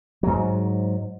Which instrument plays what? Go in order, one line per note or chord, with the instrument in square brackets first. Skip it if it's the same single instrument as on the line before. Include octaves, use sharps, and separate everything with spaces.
[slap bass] G#2 F#3